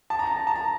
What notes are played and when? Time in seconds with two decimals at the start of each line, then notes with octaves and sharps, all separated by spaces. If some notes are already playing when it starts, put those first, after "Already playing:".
0.10 A5
0.19 A#5
0.27 A5
0.37 A#5
0.47 A5
0.56 A#5